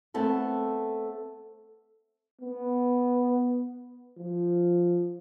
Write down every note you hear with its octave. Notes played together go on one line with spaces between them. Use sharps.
A3 B3 C4 A4
B3
F3